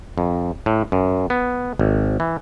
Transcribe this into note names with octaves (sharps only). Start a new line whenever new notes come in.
F2
A2
F#2
B3
G#1
E3